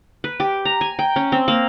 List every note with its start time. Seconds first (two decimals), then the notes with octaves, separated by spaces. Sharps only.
0.24 B4
0.40 G4
0.65 A#5
0.81 G#5
0.99 G5
1.16 C#4
1.32 C4
1.48 A#3